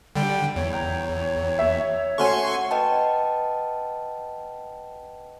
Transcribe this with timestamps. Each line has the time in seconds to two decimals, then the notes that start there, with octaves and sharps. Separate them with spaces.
0.15 D3 G3 G5
0.56 E2 C#5
0.73 G5 A#5
1.59 E5
2.18 A3 C#4 F#4 G#5 C6 C#6
2.71 B4 D#5 F#5 G5 A5